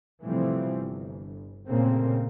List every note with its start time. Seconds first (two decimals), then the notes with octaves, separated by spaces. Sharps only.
0.24 A2 C3 E3 F3 G3 C4
0.72 G1
1.68 A#2 C#3 A3 A#3 C4